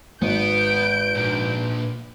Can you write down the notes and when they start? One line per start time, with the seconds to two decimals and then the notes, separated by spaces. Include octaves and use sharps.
0.22 G#1 B3 B4 G6 D7
1.15 A#2 D4